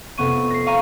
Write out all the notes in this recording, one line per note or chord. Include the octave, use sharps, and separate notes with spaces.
F1 B3 C#6 D#7
A#6 C7
F5 G#5 A#5 C#6 D#7